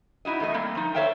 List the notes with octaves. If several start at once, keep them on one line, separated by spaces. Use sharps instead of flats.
D#4 E4 F#4 D#5
E2 A3 D#5
G3 A3 A#3 C4
F3 D#4
A4 C5 C#5 E5 F5 G5